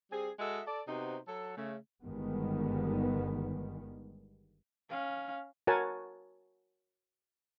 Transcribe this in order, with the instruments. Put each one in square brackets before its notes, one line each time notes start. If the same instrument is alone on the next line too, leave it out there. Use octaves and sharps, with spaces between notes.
[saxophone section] G3 C4 G#4
G#3 F#4 A4 D#5 E5
A4 D5
C3 B3 D#4 F#4 C5
F#3 A4
C#3 A3
[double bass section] G1 G2 D#3 G3 G#3 B3
[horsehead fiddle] C#4 F5
[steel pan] F#4 A#4 C#5 F#5 G#5 A5